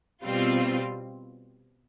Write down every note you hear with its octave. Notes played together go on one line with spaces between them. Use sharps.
B2 G3 C4 F4